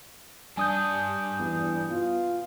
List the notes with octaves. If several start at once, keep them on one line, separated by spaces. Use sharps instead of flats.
G2 D4 G#5 D#6 G6
E2
B2 F4